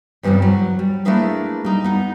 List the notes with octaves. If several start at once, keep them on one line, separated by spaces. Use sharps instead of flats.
E2 G2 C#3 G3 C4
F#3
G3
A3 A#3 D4 E4 G#4 B4
G3 D#4
B3 D#4